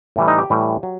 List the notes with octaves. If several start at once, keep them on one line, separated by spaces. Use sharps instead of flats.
A2 E3 G3
D#4
G4
A2 E3 G3
F#3